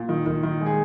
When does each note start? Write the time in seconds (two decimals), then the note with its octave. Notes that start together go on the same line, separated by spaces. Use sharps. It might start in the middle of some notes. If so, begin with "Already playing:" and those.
Already playing: A#2
0.09 D#3
0.26 D#3
0.43 D#3
0.61 G#3
0.66 G#4